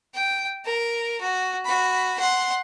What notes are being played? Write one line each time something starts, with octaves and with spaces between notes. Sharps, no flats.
G5
A#4
F#4
F#4 B5
F#5 C6